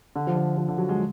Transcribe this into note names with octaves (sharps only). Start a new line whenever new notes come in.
D3
F3
D3
F3
D3
F#3
G#3